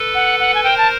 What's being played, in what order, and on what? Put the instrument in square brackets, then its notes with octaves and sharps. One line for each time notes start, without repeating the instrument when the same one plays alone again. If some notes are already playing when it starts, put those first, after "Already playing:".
Already playing: [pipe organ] A4 B4
[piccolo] F#5
F#5
G#5
[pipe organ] A#4 C5 [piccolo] G5
[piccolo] A5